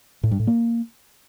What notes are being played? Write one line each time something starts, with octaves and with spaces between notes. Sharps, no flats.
A2
G2
A2
A#3